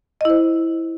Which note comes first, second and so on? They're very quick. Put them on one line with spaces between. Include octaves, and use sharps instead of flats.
D#5 E4 C5